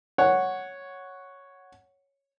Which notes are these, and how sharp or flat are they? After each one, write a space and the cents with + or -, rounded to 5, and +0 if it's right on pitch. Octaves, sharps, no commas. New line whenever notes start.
C#5 +0 F#5 +0